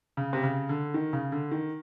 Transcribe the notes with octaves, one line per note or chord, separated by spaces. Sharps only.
C#3
C3
C#3
D3
D#3
C#3
D3
D#3